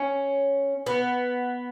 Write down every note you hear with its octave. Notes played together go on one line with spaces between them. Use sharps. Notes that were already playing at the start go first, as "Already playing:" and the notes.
Already playing: C#4
B3